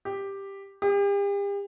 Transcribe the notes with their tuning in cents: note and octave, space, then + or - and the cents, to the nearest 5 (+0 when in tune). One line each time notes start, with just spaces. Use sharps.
G4 +5
G4 +40